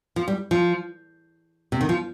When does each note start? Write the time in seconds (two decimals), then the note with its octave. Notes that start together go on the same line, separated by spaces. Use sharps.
0.16 F3
0.28 G3
0.51 F3
1.72 C3
1.81 D#3
1.89 F3